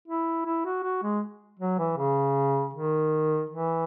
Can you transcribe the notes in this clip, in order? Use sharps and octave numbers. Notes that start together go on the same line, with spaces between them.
E4
E4
F#4
F#4
G#3
F#3
E3
C#3
D#3
E3